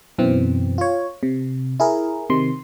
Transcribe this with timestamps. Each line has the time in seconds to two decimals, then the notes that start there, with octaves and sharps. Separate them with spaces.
0.18 F#2 B2 E3 C4
0.78 F4 C#5
1.23 C3
1.80 E4 G#4 A#4
2.30 C3 D#3 C6